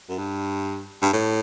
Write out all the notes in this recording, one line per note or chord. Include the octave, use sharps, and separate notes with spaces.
F#2
G2
G2
A2